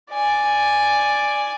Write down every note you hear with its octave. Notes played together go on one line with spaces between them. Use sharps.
D5 G#5